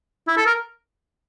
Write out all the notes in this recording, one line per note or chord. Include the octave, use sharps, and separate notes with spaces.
E4
A4
A#4